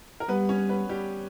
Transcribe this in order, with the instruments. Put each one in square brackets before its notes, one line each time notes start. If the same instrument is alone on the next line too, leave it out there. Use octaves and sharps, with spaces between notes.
[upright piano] A#4
[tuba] G3 [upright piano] B3 B4
[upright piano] C#4 C#5
B3 B4
G3 G4